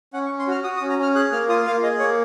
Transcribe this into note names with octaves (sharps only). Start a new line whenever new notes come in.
C#4 F#5
C#6
C#4
C6
F#4 F6
F#4 D#6
D#6
C#4
A#5
C#4 F6
G#4 F#6
A#3 F6
F4 D#6
A#3 F5
G#4 D#5
A#3 C#5